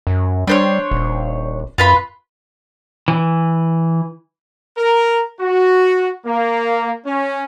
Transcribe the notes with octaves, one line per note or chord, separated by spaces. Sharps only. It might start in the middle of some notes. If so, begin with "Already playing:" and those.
F#2
G3 D4 C5 C#5
D#1
F#2 F4 B4 B5
E3
A#4
F#4
A#3
C#4